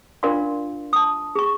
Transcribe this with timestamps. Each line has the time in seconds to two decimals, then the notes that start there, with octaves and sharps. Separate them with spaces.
0.23 D4 F4 A#4 D5 F5 C6
0.93 A5 D#6
1.35 G#4 C#6